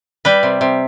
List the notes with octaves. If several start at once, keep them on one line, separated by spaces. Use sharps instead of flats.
G3 B4
C3
C3